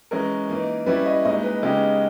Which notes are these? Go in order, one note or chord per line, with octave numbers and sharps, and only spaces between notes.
E3 G#3 C#4 A#4
E3 A#3 D#4
G3 C#4 E4 B4
D#5
A#2 G#3 D#4 D#5
B4
C#3 G#3 B3 D#4 G4